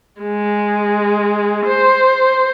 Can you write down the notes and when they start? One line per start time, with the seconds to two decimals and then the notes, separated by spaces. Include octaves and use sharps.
0.21 G#3
1.66 C5